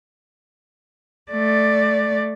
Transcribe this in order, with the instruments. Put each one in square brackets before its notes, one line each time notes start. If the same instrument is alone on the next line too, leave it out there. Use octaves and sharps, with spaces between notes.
[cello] A3 D5